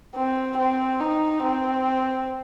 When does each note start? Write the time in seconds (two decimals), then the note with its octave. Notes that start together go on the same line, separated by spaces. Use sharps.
0.15 C4
0.58 C4
1.01 D#4
1.43 C4